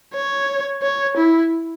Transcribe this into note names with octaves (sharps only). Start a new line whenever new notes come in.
C#5
C#5
E4